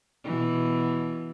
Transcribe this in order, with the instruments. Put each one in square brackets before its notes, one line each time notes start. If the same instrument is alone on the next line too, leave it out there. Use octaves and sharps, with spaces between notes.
[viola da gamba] B2 E3